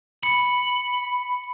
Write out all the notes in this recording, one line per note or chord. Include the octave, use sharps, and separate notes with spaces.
B5 C#7